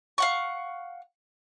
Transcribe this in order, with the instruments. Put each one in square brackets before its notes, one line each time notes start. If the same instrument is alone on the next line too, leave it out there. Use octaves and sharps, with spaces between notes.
[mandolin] F5 F#5 C#6